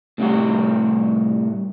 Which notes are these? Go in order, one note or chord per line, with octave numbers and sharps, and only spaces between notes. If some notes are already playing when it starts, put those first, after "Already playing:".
A2 C3 G3 F#4